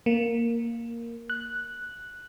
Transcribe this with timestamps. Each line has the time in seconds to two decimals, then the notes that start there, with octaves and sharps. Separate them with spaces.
0.06 A#3
1.30 F#6